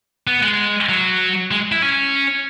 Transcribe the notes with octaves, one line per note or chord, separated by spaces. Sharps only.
B3
G#3
F#3
G#3
E4
C#4